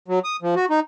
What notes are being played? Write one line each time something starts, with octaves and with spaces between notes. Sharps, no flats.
F#3
D#6
F3
F#4
D#4